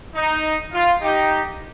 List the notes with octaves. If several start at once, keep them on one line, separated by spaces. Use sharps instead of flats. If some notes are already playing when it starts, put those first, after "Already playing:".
D#4
F4
D#4 G4